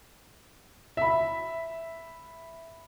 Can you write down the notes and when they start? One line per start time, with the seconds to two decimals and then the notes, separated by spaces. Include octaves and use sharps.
0.97 E5 B5